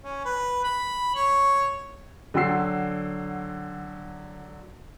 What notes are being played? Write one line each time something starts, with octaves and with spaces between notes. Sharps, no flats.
C#4
B4
B5
C#5
D3 F#3 G5 C6 E6 C7